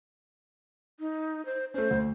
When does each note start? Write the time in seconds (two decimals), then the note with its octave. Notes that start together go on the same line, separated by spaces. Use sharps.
1.00 D#4
1.46 C5
1.74 A3 C#4 C5
1.91 D2